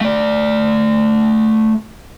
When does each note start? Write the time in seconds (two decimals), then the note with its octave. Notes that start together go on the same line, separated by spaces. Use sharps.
0.01 A3 D5